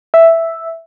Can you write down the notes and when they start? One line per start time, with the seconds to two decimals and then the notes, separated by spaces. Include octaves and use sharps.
0.14 E5